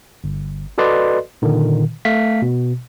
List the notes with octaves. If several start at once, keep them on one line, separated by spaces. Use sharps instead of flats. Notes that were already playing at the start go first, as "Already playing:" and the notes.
G1
F#4 A4 B4 D5 D#5 C6
A#2 D3 D#3
A3 F5 B6
B2